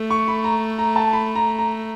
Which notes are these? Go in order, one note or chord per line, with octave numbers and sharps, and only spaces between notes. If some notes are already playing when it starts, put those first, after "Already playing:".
Already playing: A3
C#6
B5
A#5
A#5
A5
B5
A#5
A#5